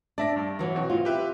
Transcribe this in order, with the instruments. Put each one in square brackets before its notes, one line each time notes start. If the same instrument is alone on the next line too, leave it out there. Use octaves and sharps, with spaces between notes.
[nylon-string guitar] D4 [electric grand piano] D5 E5 A#6
[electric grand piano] G2
[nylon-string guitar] E3 F#3
[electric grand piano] B2 C4 F#4
[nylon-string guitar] F4
[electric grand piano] G4 B4 E5